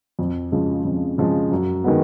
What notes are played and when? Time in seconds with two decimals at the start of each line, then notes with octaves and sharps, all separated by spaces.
0.19 F2
0.52 C#3 F3 G#3
0.85 F2
1.18 C#3 F3 G#3
1.52 F#2
1.84 D#3 G#3 B3